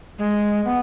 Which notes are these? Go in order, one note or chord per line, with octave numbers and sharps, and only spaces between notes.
G#3
B3